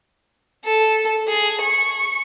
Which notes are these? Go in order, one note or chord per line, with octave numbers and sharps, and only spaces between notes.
A4
G#4
C#6